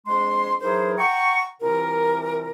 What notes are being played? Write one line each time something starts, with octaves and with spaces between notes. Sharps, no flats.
F2 G#3 D4 G#4 C6
E3 F#3 D#4 G#4 A#4 C5
F#5 G5 A#5 C#6
C2 C3 E3 F4 A#4